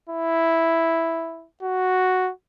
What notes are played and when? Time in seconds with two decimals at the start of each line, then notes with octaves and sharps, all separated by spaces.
0.09 E4
1.62 F#4